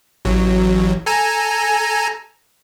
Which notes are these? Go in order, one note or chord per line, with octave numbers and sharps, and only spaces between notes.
A1 F#3
A4 G#5 A#5